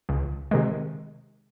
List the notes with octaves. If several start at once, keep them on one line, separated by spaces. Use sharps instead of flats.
C#2
C3 D#3 G#3